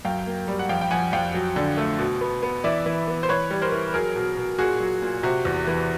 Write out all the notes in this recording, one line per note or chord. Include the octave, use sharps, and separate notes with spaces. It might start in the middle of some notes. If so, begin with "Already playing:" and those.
F#2 F5 G5
A#3
G3
F#5
F2 F5 G5
G5
F2 F#5 G#5
F2 F5 G5
F#3
D3
A3
B2
B3
B3
E3 D5 E5
E3
B3
C5
E3 B4 C#5
G3
A#4 C5
E3
F#3 G#4 A#4
B2
B2
A#2 F#4 G#4
F#3
A#2
C3 F#4
E2
E3